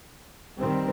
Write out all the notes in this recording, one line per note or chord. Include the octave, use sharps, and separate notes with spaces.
D#3 G3 C4